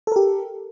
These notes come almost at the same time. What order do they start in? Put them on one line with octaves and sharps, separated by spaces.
A4 A#4 G4